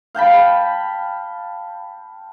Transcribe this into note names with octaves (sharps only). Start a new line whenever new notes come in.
F5 G5 A5 B5